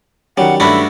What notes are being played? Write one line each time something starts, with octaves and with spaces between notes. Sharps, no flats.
D#3 F#3 G3 C#4 F#5
G2 A3 D4 E4 F#4 B5